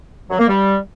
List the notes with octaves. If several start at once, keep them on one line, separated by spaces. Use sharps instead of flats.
F#3
A#3
G3